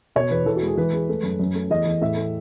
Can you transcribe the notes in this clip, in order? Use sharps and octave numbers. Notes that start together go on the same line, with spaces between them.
B2 C#5
E2 B4
E3 A4
F#4
G#3 G#4
E3 B4
G#3
A3
F#2
F#2
A3
E2 D#5
E2
A2 E5
A3